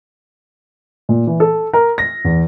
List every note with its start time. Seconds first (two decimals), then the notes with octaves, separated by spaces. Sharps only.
1.09 A#2
1.27 E3
1.40 A4
1.73 A#4
1.98 A#6
2.25 E2